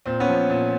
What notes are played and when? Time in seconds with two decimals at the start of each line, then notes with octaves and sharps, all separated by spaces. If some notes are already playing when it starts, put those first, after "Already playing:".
0.06 A#2 C4
0.20 B3 C#4
0.28 F3
0.50 A#2